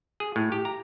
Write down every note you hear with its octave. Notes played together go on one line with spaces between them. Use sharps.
G#4
A2
G4
A#5